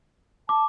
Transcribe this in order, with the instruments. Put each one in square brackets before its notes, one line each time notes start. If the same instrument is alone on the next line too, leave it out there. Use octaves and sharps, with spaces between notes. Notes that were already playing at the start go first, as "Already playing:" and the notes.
[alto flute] A5 [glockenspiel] D6